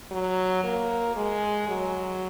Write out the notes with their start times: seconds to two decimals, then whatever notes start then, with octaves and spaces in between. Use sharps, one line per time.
0.11 F#3
0.64 A#3
1.16 G#3
1.69 F#3